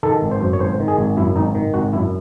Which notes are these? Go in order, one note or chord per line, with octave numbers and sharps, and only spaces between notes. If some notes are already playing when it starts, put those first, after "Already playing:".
D#3 A4
G#1
C5
F#2
C#5
G#1 C5
D#3
G#4
G#1
F#2 E4
G#1 D#4
D#3
G#1 F#4
F#2 E4